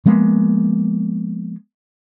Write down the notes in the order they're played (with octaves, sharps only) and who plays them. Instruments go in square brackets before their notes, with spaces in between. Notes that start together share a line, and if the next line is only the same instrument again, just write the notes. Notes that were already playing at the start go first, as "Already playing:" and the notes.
[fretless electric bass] F3 G#3 A#3 B3